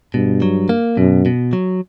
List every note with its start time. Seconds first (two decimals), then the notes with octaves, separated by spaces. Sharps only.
0.14 G2 B2
0.42 F#3
0.69 A#3
0.97 F#2 B2
1.26 B2
1.53 F#3